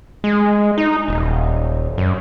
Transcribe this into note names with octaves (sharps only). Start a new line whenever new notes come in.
G#3
D#4
D#1
F#2